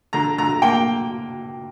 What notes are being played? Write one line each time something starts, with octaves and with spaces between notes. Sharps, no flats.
D3 A#5
D3 A#5
A#3 G5